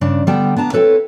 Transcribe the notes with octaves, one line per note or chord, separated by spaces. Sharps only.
G2 C#3 D4
D3 G3 B3 F#5 G5 A5
B3 D4 A5 A#5
C4 E4 A4 B4 C#5